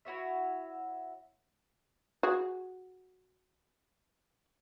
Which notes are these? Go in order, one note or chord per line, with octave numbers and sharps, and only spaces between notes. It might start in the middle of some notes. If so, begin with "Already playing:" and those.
E4 F#4 C#5 E5
F#4 G#4